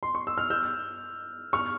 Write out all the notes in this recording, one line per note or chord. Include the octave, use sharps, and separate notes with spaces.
C6
C#6
E6
F6
E6 G6
C#6 F6